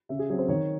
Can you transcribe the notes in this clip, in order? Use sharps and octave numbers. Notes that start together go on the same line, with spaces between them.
C#3 E5
G#4
F#3 C4 G#4
C5
D#3 C#5